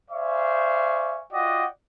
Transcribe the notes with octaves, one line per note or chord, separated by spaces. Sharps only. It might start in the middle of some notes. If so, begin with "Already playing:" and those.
C5 D5 E5 F5 G#5 C#6
F4 F#4 D5 D#5 F#5 G5